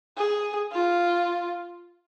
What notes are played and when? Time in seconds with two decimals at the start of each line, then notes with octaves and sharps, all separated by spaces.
0.17 G#4
0.72 F4